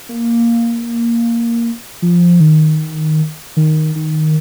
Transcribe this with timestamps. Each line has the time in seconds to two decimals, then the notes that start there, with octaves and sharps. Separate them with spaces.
0.09 A#3
2.02 F3
2.40 D#3
3.57 D#3
3.96 D#3